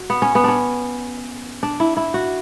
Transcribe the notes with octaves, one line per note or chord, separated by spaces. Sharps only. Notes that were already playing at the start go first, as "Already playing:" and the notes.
Already playing: F#4
B3
C#4
B3
C#4 D4
D4
E4
E4
F#4